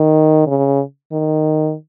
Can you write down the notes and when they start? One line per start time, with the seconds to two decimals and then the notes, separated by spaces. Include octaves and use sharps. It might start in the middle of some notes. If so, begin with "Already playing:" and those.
Already playing: D#3
0.47 C#3
1.12 D#3